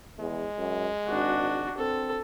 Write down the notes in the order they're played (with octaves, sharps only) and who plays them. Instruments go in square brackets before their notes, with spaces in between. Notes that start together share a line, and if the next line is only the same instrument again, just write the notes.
[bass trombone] E2 [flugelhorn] G#3
[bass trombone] F#2
[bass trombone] G#1 [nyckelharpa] D4 F#4
[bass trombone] C4 [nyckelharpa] A4